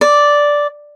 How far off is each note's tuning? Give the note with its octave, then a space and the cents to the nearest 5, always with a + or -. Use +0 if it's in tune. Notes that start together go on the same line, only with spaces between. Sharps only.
D5 -5